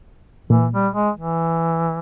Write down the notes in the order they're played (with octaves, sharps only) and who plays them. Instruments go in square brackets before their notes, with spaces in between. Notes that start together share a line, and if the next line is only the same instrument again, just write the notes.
[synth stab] A#2 [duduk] E3
[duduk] G3
G#3
E3